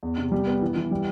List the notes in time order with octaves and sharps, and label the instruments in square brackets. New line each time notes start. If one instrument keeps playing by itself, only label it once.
[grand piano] E2
C3
G3
B3
E3
E3
G3